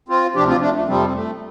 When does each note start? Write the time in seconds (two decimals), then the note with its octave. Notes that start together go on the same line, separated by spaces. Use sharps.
0.09 C4 F4
0.35 D2 C3 F3 D4 G4
0.48 C4 F4
0.61 A3 D4
0.75 A3
0.87 F2 C3 F3 G3 C4
1.07 C4
1.13 A3